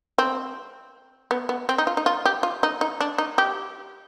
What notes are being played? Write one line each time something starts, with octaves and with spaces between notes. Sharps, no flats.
C4
B3
B3
C4
D#4
F4
D#4
F4
G4
F4
D#4
D#4
D4
D#4
G4